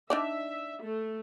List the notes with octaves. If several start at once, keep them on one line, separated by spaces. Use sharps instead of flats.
D4 D#4 D5 E5
A3